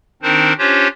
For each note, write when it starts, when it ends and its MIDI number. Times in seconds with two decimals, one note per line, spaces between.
0.22 0.53 51
0.22 0.53 60
0.22 0.53 62
0.22 0.53 63
0.22 0.53 70
0.22 0.53 72
0.58 0.88 61
0.58 0.88 62
0.58 0.88 65
0.58 0.88 67
0.58 0.88 72
0.58 0.88 73